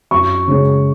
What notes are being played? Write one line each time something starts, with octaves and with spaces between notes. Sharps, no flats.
F#2 C#6
C#3 G#3 C#4